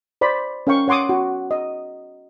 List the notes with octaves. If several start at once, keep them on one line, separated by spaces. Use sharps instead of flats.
C5 D5 B5
C#4 A#4 F5 G5 C#6
C#5 F#5 C6 D6 D#6
F#4
D#5